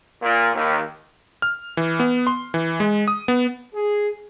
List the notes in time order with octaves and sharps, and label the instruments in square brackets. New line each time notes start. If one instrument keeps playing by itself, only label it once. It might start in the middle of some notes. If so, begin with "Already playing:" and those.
[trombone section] A#2
D#2
[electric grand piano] F6
E3
B3
C6
E3
G#3
D#6
B3
[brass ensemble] G#4